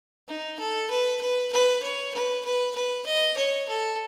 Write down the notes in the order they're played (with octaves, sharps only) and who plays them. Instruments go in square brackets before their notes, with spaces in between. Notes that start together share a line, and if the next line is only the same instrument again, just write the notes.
[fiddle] D#4
A4
B4
B4
B4
C#5
B4
B4
B4
D#5
C#5
A4